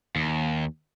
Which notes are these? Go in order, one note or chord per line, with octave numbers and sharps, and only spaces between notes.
D#2